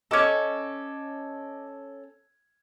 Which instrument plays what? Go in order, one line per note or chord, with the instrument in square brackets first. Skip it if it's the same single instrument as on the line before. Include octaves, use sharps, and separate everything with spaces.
[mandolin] C#4 A4 [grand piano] D#5 D6 G#6